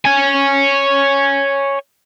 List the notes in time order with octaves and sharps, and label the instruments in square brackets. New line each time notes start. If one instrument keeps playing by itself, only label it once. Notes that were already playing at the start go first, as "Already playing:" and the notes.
[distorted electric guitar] C#5 G#5